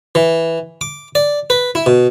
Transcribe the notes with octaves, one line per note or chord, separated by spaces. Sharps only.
E3
D6
D5
B4
E4
B2